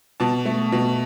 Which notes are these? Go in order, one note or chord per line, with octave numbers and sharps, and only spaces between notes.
B2 A5
A3
B2